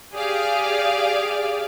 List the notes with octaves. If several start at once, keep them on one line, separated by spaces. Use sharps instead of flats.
G4 G#4 D5 F5